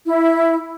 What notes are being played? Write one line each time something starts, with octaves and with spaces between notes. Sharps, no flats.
E4